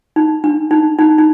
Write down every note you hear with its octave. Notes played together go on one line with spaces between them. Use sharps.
D#4
D4
D#4
D#4
D#4